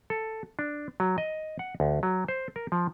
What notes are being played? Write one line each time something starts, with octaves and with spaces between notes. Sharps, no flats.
A4
D4
F#3
D#5
F#5
D2
F#3
C5
A#4
F3